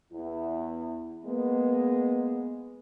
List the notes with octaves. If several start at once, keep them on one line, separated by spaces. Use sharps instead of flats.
E2 E4
G#3 A#3 B3